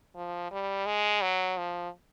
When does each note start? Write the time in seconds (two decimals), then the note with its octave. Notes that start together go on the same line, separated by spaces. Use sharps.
0.16 F3
0.51 G3
0.86 G#3
1.22 F#3
1.57 F3